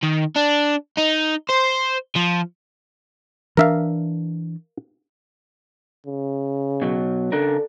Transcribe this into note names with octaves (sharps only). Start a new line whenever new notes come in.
D#3
D4
D#4
C5
F3
E3 D4 A#4 E5 F5
C#3
B2 F#3
C#3 D4 A4 A#4